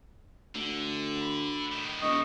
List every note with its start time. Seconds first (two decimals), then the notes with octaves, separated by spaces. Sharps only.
0.55 D2 D3
1.21 B5
1.72 A2 D#3
2.02 E1 D#5 C#6 D#6